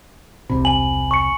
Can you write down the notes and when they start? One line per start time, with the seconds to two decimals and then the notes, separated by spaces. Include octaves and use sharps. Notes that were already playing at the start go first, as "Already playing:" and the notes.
0.50 E1 C2 C3 B5
0.65 G#5 F#7
1.11 C#6 C#7